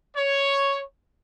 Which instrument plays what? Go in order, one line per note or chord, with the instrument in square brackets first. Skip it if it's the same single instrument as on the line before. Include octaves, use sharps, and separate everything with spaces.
[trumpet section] C#5